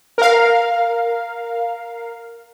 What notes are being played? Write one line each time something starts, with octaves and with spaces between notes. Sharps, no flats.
A#4 F5